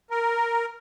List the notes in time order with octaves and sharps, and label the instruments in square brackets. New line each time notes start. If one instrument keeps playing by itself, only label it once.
[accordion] A#4